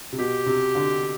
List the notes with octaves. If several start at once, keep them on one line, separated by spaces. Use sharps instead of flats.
C3
B2 G4
C3
D3